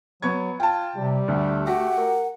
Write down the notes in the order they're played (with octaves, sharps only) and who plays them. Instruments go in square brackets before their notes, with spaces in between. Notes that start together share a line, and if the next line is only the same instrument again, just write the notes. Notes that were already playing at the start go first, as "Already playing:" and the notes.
[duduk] F#3 [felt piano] B3 C#6 G#6
[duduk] F4 [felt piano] G5 A5
[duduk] C3 [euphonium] G3
[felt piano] D2 [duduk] A3
[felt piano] F#4 G4 [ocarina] F#5
[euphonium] A#4